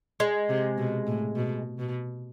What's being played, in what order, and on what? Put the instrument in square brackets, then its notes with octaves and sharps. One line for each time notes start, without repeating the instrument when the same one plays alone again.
[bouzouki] G#3
[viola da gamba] C3
B2
A2
B2
B2